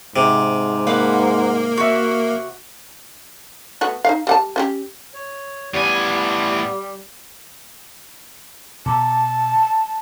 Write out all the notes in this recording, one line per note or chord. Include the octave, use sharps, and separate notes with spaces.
G#2 C3
A#3 B4 F5 F#5
F#4 E5
A3 B3 F#4
D#4 F5
G3 F#5 A5
C#4 F#4 G4
C#5
A2 G3 B3 G#5
B2 A5